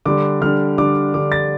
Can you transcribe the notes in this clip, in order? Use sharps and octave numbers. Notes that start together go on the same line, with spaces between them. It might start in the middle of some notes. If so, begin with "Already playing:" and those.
D3 G3 D4 D6
D3 G3 D4 F6
D3 G3 D4 D6
D3 G3 D4 D6
A6